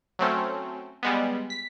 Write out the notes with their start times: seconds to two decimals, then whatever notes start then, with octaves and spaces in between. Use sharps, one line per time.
0.19 F#3 A3 C4 C#4
1.03 G3 G#3 B3
1.50 B6